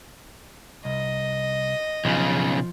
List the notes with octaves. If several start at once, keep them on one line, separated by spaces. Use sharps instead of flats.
C2 D#5
B1 C#3 F3